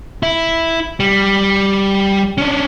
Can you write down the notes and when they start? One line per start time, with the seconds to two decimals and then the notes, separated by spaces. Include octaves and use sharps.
0.23 E4
1.00 G3
2.38 C#4 D4